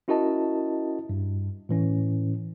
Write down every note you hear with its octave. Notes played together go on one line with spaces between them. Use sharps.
C#4 E4 F#4 A#4 D#5 A5
G2
A2 E3 C#4